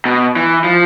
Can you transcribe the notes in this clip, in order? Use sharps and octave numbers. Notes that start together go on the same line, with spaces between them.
B2
E3
F3